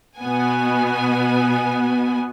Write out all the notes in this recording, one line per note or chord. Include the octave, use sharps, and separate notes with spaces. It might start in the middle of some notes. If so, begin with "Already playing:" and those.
B2 B3 G#5